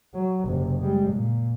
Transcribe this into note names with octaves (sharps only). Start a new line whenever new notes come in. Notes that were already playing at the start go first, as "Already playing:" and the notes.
F#3
F#1 C3
G3 G#3
A#2